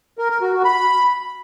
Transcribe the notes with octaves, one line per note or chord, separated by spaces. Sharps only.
A#4
A#4
F#4
F#4
B5